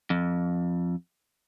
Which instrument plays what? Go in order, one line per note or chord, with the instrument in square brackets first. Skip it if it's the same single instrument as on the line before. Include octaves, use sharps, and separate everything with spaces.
[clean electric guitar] F2